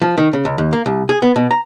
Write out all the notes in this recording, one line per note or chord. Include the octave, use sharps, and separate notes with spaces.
F3
D#3
C#3
C#2
D#2
A#3
C2
G#4
B3
B2
A#5